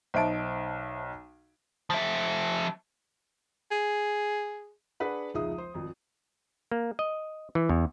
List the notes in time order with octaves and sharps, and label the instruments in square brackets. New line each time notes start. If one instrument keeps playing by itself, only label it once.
[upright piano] B1 D#4 D7 [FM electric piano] C5 E5 A5
[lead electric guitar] F3 E5
[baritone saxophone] G#4
[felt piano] D4 G#4 B4 F#5
F1 C#2 G#3 D#4 E5 D#6
C5
G#1 F2
[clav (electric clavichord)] A#3
D#5
E3
E2